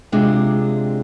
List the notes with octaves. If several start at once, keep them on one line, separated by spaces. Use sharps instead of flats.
C3 G#3 D4 F4 G#4